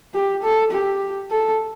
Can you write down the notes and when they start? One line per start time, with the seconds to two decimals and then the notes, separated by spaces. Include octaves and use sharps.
0.14 G4
0.43 A4
0.71 G4
1.30 A4